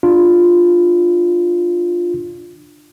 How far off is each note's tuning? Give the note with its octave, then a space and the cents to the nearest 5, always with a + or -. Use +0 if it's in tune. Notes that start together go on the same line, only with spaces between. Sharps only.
D4 +20 F4 +5